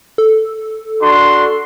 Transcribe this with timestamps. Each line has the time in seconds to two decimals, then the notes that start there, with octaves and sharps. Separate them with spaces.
0.18 A4
1.02 D4 F#4 C6